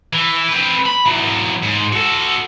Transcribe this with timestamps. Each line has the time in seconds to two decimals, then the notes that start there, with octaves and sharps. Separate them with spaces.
0.13 E3
0.49 C4 B4
0.86 B5
1.06 E3 F#3
1.63 G#2
1.93 F#4 A4